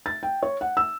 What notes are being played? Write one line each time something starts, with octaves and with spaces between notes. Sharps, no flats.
A6
G5
C#5
F#5
E6